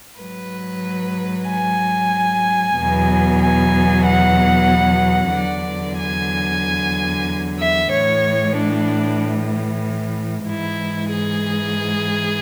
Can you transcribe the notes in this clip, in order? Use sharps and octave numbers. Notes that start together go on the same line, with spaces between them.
G#2 F#3 B4
G#5
E2 B2 F#3
G#5
F#5
E2 D3 F#3 D5
G#5
E5
A2 E3 C#5
D4
G#2 E3 E4
G#4